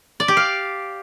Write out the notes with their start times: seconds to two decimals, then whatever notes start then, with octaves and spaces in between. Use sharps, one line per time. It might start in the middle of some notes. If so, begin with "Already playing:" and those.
0.20 D5
0.28 G4
0.37 F5